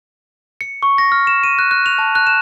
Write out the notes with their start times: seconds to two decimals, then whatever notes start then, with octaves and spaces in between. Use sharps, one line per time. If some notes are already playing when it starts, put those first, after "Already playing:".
0.61 C#7
0.83 C#6
0.98 A#6
1.12 F6
1.27 E7
1.43 D#7
1.59 F#6
1.71 F#6
1.86 F7
1.98 A5
2.15 F#6
2.27 E7